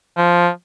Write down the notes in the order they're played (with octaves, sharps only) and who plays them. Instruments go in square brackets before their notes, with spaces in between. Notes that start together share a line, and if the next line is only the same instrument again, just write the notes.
[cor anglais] F3